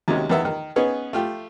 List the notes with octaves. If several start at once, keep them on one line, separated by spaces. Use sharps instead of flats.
D#2 C3 F#3 G#3 C#4
E2 D#3 B3 E5
D#3
B3 C#4 D#4 G#4 B4
A3 F4 G4